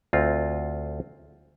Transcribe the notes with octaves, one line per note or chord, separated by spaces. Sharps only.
D2 C4 F4